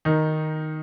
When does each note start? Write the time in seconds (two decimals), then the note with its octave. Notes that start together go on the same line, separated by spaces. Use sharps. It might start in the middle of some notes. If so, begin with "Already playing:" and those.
0.05 D#3 D#4